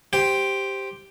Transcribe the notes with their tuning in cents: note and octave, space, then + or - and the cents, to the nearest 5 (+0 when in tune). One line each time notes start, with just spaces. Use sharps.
G4 +0 C5 +0 G5 +0